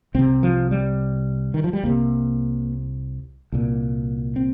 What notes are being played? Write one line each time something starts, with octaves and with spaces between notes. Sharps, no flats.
C2 C3 C4
F3
G3
D#3
F3
G3
C2 C3 A#3
C2 A#2
C4